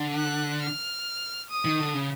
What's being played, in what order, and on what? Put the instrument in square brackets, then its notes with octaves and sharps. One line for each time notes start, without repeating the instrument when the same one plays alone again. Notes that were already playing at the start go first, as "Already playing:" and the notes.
Already playing: [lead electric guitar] D3
[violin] F#6
F6
D#6
[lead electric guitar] D#3
D3
C#3